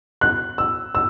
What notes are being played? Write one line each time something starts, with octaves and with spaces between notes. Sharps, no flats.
F#6
E6
E6